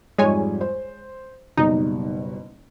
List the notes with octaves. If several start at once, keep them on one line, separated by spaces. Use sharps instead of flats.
F2 G#2 G3 G#3 C#5 G#5
C5
F#1 B2 G3 D#4